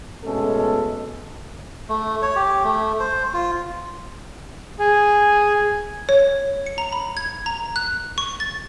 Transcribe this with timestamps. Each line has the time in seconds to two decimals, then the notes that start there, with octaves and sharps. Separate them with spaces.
0.25 B2 G#3 A3 C#4 A4
1.89 A3
2.22 C#5
2.36 G4
2.64 A3
3.00 C5
3.34 F4
4.79 G#4
6.09 C#5
6.66 C#7
6.78 A#5
6.93 B5
7.17 G#6
7.46 A#5
7.76 F#6
8.18 C#6
8.40 A6